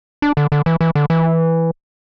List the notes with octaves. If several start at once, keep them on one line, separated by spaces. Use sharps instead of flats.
D4
D3
D3
E3
E3
D3
E3